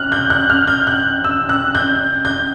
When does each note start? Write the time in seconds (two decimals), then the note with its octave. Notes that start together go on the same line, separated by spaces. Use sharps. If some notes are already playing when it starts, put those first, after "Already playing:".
Already playing: F6 F#6
0.12 G6
0.30 F#6
0.50 F6
0.67 G6
0.87 F#6
1.24 E6
1.49 F#6
1.75 G6
2.25 G6